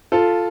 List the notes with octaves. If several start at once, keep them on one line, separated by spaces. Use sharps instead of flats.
F4 A4